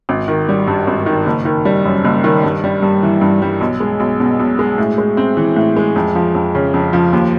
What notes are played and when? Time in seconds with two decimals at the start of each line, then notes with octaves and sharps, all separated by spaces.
0.09 G#1
0.28 D#3
0.49 G3
0.68 G2
0.87 G#1
1.06 D#3
1.26 F#1
1.45 D#3
1.65 G3
1.85 F#2
2.05 F#1
2.24 D#3
2.44 G2
2.64 G3
2.82 G2
3.03 E3
3.21 G2
3.42 G3
3.61 B1
3.80 G#3
4.00 B1
4.20 B2
4.39 B1
4.59 G#3
4.78 A2
4.98 G#3
5.17 C4
5.37 E3
5.56 A2
5.76 G#3
5.96 F2
6.15 F3
6.35 F2
6.55 C#3
6.74 F2
6.93 F3
7.13 D#2